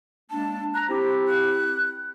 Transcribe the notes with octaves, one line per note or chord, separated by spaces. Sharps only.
G#3 A#3 D4 A5
A#5 F#6
C4 E4 G4 C5
F#6